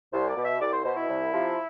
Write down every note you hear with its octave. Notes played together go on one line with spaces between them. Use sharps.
C2 C5
D5
B2
E5
C2 D5
C5
B2 C5
E4
C2
C3 F3